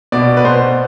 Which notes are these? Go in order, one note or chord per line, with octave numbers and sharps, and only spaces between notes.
B2 D5
B4
B2 C5